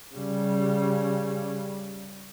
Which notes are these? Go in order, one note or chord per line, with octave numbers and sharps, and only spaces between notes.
C#3 G3